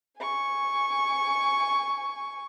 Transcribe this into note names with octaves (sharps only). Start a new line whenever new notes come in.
G#5 C#6